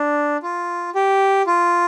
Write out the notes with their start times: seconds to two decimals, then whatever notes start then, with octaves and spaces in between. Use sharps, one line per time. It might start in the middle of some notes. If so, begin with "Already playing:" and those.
Already playing: D4
0.43 F4
0.95 G4
1.47 F4